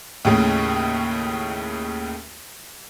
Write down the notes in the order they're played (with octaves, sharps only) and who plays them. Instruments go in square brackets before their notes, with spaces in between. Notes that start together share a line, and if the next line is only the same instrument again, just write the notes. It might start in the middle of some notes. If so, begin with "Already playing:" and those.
[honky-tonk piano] D#2 A2 C#3